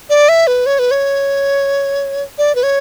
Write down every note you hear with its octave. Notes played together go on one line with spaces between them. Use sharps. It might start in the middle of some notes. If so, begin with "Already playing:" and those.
D5
E5
B4
C#5
B4
C#5
D5
B4
C#5